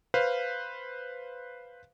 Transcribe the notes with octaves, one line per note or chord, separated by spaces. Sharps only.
B4 C5 F5